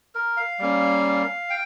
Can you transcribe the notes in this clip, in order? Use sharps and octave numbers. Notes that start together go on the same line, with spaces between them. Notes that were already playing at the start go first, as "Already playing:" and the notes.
A#4
F5
G3 A#3 C#4
G5